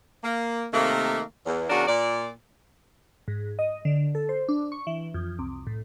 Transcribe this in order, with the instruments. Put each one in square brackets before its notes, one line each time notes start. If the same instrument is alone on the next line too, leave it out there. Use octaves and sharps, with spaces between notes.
[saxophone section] A#3
C3 D#3 A3 A#3
E2
E2 C#3 D4 F#4 A#4
A#2 D5
[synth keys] G#2
D#5
D3
A4
C5
D4
C#6
E3
F2
C2
A2